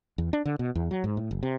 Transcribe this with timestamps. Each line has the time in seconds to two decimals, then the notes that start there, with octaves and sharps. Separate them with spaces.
0.18 E2
0.33 D4
0.45 D3
0.59 B2
0.75 E2
0.91 F#3
1.04 G#2
1.17 A2
1.31 F#1
1.43 C3